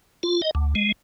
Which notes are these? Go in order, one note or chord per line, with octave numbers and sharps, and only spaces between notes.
F4
D#5
D2
G#3